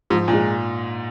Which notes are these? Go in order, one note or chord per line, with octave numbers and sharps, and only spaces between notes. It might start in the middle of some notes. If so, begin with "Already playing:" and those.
G#2 F3
A#2
G#3